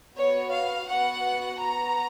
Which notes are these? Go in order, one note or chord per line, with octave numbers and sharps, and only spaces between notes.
B3 F#4 C#5
F5
B3 F#4 F#5
B3 F#4 A#5